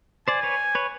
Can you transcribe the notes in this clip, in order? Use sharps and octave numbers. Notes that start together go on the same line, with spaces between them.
C5 D5 G#5
B4 C#5
B4 C#5